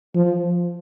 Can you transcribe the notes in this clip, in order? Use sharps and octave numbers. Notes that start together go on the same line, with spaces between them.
F3